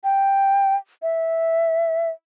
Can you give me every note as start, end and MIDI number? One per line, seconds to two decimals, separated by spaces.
0.04 0.76 79
1.02 2.10 76